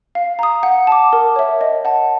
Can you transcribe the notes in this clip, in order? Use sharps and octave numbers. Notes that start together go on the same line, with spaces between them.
F5
A#5 D#6
F#5
A5 D6
A#4
C#5 E5
D#5
F#5 A5